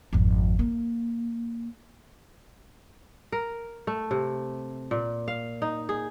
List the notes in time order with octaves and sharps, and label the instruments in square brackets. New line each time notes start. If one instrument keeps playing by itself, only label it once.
[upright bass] G#1 F2
A#3
[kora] A#4
A3
C3
A#2
F5
D#4
G#4